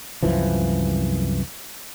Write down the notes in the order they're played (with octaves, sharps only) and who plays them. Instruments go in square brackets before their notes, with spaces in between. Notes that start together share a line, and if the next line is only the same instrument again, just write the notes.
[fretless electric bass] C2 F#2 E3 F3